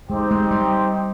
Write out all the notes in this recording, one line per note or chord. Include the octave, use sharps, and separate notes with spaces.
G#3 C4 D#4 G4 C5
G#3
G3